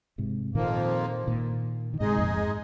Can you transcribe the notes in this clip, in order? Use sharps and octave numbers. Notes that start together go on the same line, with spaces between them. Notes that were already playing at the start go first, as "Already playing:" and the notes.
G#2 C3
F2 A#2 D#3 F3 A#3
A#2 D#3
D#3
G#2 C3 G#3 D#4 G#4 D#5
F2 A#2
G#2